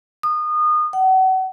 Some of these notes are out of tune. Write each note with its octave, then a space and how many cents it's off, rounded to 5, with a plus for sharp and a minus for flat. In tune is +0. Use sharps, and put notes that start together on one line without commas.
D#6 -30
F#5 +35